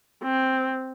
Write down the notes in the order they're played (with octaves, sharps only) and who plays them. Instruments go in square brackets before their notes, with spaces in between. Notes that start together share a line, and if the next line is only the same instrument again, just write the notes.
[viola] C4